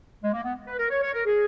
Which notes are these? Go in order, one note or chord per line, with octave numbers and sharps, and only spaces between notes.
G#3
A#3
B3
B4
A#4
C#5
C#5
A#4
G#4